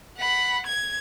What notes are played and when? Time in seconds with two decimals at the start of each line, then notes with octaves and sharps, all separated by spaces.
0.18 F#5 B5
0.66 G#6